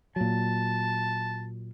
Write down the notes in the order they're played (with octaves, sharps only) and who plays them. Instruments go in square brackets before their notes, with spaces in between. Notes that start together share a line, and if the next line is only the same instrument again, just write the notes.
[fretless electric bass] A#2 F#3 [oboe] A5